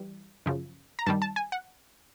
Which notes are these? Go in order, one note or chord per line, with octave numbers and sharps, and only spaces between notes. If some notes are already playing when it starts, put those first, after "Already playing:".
Already playing: E3 G3
F#2 C#3 F3
A#5
G2 D#3 G3 A5
A5
G#5
F#5